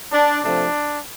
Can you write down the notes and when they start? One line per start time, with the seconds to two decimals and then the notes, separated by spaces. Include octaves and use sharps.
0.12 D4
0.44 C3 F3 A3 C4 D4